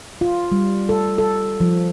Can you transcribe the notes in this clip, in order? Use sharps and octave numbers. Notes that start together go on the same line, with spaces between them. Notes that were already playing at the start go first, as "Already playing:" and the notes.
F4
G3
A4
A4
F3